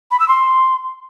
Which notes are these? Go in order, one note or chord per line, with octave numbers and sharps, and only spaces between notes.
B5
E6
C6